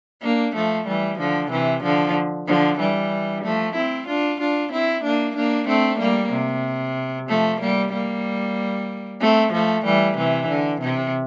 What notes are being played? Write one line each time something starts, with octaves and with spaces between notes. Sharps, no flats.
A#3 D4
F3 A3
E3 G3
D3 F3
C3 E3
D3 F3
D3 F3
E3 G3
F3 A3
C4 E4
D4 F4
D4 F4
C4 E4
A#3 D4
A#3 D4
A3 C4
G3 A#3
C3
F3 A3
G3 A#3
G3 A#3
A3 C4
F3 A3
E3 G3
C3 E3
D3
C3